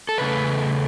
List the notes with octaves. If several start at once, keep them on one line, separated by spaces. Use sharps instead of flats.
A4
E2 C#3 A3 B4